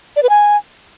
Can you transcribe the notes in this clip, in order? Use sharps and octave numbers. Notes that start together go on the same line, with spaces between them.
D5
B4
G#5